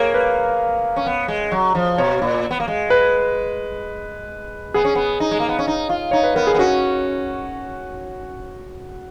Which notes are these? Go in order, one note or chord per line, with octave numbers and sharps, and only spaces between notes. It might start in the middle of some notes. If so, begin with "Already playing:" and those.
Already playing: A#3 G#4 A#4 C#5
B4
C#4
B3
G#3
F#3
F3
B2 C#5
A#2
B3
A#3
G#3
B4
B3 G#4
C#4
B3
D#4
G#3
A#3
B3
C#4
D#4
F4
D#4 C#5
B4
B3 A#4
G#4
B3
C#4 F#4